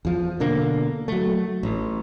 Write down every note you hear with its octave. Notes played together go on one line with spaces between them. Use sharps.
E2 F3
B2 D3 A#3
F#3 A3
A1